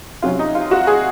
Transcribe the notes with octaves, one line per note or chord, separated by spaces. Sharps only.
C3 F#3 C#4 F4
D#4
F4
F#4
G#4